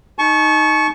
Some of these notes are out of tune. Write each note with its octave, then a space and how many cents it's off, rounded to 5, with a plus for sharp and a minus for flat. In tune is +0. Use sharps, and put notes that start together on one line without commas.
D#4 +0 A5 -35 C#6 +0